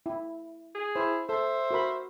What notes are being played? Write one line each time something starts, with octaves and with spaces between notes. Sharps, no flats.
E4
G#4
E4 C5
A4 C5 E5
F#4 A#4 B5